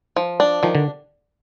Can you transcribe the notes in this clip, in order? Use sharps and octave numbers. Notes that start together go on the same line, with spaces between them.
F3
D4
D#3 F3
D3